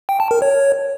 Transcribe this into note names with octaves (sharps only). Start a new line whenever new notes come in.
G5
A5
A#4
C#5